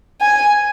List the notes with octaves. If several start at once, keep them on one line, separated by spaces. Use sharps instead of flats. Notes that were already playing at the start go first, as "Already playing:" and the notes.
G#5